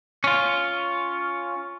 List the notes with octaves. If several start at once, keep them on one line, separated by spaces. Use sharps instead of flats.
C#4 F4